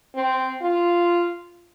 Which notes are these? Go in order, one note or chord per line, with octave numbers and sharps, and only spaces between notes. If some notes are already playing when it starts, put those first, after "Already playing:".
C4
F4